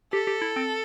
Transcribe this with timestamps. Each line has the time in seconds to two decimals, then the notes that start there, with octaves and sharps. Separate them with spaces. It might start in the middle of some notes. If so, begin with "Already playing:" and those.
0.13 G4 A4
0.27 G4
0.42 E4
0.56 C4